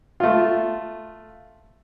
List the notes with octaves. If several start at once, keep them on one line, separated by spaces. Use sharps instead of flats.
A3 F4